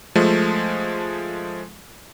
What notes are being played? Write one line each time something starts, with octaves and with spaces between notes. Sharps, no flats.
F3 G#3 A3